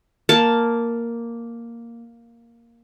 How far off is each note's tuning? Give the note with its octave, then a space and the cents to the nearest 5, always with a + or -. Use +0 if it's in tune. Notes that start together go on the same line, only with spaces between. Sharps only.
A#3 +0 A5 +0